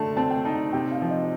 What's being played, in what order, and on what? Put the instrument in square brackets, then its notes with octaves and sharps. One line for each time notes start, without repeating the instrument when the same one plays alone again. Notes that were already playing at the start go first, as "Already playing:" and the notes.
Already playing: [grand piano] D3 A3 [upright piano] A5
[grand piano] C4 [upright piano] A5
[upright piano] G5
[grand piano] D#4 [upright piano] A5
[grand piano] C3 [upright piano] G5
[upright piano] F5
[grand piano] F3
[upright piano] D#5